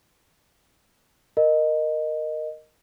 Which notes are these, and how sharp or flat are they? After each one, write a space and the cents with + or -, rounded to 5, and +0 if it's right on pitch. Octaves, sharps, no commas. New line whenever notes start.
A#4 +0 D#5 -10